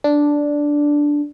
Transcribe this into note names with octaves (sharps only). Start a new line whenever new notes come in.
D4